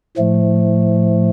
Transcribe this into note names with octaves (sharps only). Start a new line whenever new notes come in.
A2 F3 A3